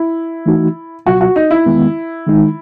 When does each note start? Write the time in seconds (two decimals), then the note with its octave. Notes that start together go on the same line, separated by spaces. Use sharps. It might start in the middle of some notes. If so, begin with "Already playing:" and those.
Already playing: E4
0.46 E3 A3 D#4 F#4
1.06 C#2 B2 F#3 F#4
1.21 F#4
1.36 D#4
1.51 E4
1.66 E2 D#3 G#3 B3
2.27 D#3 G#3 D#4